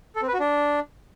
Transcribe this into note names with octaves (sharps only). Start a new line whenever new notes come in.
A4
C4
B4
F#4
D4